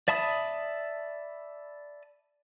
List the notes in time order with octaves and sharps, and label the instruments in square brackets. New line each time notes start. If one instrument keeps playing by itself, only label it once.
[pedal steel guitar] D5 E5 A5 B5 D#6